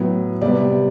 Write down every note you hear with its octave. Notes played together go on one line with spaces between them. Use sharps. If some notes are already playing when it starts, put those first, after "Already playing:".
Already playing: A2 F#3 B3
C3 G3 B3 D5